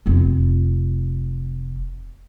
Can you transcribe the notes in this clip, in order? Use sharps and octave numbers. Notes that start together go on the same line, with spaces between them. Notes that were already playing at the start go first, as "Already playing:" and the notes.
F1 F4